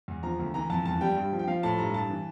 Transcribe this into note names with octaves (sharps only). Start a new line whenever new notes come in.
E2
F3 A#5
D2
E3 A#5
F2 A5
E2 A5
G3 G5
G2
F3
G5
F3 F5
A2 A5
G2 A#5
G2 A5
E3